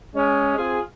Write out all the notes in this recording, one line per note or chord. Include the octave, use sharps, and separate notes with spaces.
G#3 C#4
C4 F4 G#4